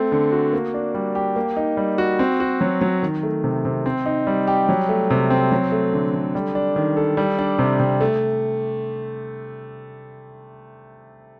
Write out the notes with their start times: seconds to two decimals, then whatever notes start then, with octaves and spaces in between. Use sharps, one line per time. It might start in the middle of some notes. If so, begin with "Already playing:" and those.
Already playing: A3 C4
0.12 D3
0.32 F#4
0.53 A#3
0.74 D4
0.94 G3
1.15 G4
1.36 A#3
1.57 D#4
1.77 G3
1.98 F#4
2.19 C4
2.40 F#4
2.61 F#3
2.81 F#3
3.03 D#3
3.23 A3
3.44 C3
3.65 C3
3.86 C4
4.06 D#4
4.27 G3
4.47 G4
4.69 F#3
4.89 A3
5.10 C3
5.30 C4
5.52 F#3
5.72 A3
5.93 D3
6.13 D3
6.35 G3
6.55 D4
6.76 D#3
6.97 A4
7.17 G3
7.39 D4
7.59 C3
7.80 C3
8.01 A3